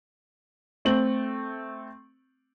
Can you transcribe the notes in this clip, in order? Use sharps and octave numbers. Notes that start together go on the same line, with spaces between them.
A3 C4 F#7